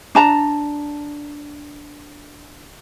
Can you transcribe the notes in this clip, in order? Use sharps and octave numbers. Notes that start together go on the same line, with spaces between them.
D4 A5 A#5